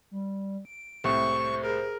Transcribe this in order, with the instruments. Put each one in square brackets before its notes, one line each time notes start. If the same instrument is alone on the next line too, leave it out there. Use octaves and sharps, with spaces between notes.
[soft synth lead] G3
D7
[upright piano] C2 A2 [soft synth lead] C5 [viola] C#6
[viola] G#4 A#4